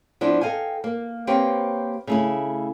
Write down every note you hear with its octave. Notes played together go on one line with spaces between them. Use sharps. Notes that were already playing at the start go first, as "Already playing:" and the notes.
F3 B3 D4 E4
A4 D#5 F5 G5 G#5
A#3
A#3 C4 G4 B4 C#5 G5
C#3 A3 E4